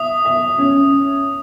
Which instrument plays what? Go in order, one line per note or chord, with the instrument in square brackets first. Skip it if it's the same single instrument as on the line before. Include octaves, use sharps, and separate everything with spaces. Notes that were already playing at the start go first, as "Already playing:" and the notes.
Already playing: [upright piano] E5 [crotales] D#6
[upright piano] E5
C#4